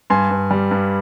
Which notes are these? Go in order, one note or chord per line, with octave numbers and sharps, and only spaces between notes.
G2 G#5 C6
G2
G3
G2